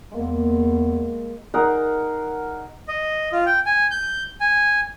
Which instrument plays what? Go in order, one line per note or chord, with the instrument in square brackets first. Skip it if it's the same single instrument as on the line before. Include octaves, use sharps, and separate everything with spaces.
[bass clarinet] E2 [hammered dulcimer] G#3 A#3
[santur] D#4 G#4 A#4 F#5
[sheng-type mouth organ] D#5
F4
G5
G#5
G6
G#5